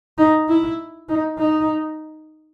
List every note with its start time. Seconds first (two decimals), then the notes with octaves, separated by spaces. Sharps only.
0.18 D#4
0.49 E4
1.09 D#4
1.39 D#4